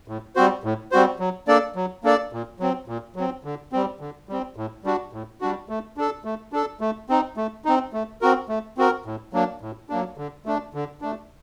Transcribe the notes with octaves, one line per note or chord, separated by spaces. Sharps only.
A2
G3 C4 F#4 C5
A2
G3 C4 F#4 C5
F#3
A#3 D4 A4 D5
F#3
A#3 D4 A4 D5
A#2
F#3 C4
A#2
F#3 C4
D3
G3 C4
D3
G3 C4
A2
G3 D4 F#4
A2
G3 D4 F#4
A3
D4 A4
A3
D4 A4
A3
C4 D#4
A3
C4 D#4
A3
C4 F#4 A#4
A3
C4 F#4 A#4
A2
F#3 A#3 D4
A2
F#3 A#3 D4
D3
A3 D4
D3
A3 D4